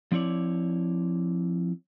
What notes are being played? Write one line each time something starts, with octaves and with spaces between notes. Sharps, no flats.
F3 C4 E4 C#5 D5